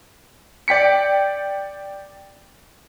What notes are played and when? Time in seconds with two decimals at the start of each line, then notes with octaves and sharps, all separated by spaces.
0.68 D5 G5 B6 C#7